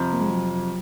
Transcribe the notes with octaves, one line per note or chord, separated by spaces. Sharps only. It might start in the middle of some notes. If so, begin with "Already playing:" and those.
Already playing: F2 C3 F3 C4
A#3
G#3
F#3